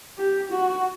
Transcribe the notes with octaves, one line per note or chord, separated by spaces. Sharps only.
G4
F#4